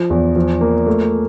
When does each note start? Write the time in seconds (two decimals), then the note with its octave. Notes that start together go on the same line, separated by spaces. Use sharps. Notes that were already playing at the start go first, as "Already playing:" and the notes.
Already playing: F3
0.10 E2
0.36 F3
0.61 A#3
0.87 A3